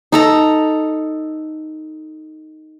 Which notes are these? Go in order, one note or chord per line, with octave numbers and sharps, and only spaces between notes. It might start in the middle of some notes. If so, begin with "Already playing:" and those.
D#4 A4 A#5